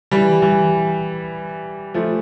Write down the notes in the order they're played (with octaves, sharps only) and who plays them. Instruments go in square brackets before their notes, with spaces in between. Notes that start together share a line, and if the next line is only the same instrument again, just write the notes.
[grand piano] E3 G3
E3 G3
F3 A3